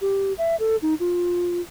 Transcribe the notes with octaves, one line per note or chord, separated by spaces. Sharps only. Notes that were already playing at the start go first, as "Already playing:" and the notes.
G4
E5
A4
D#4
F4